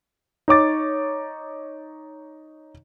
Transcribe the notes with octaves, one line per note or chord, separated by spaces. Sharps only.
D#4 C#5 D6 A6